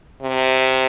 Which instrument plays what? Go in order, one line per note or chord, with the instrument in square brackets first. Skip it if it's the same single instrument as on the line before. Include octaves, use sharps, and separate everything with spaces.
[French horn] C3